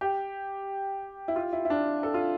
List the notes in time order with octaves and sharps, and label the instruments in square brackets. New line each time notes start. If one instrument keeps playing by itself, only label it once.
[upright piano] G4
E4
F4
E4
E4
D4
A4
F4